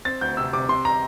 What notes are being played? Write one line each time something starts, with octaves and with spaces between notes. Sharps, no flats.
C4 A6
D2 G6
C3 E6
C3 D6
C3 C6
A#5